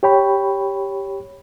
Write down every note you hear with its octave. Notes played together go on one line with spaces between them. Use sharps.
G4 C#5 G5 B5